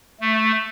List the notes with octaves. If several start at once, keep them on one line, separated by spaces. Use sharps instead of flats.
A3